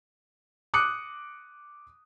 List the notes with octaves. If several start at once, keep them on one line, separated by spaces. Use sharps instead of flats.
D6 D#6 F#6 C#7